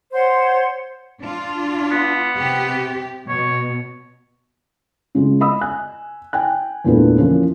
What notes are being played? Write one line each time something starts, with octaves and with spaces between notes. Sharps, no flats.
C5 C#5 F#5 C6
D4 F4
B3
C3 G4
B2 C#5
C#3 G#3 F4
D#5 B5 D#6 E6
G#5 F#6
G5 G#5 F#6
E2 G2 A#2 A3 F4 B4
E3 F3 A#3 C#4